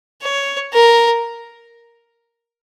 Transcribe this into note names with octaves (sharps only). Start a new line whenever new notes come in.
C#5
A#4